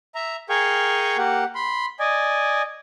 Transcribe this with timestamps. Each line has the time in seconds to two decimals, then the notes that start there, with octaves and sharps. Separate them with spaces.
0.15 E5 A#5
0.49 G#4 A#4 F5 G5 G#5 C#6
1.18 A#3 G4 F#5
1.55 B5 C6
2.00 D5 D#5 G#5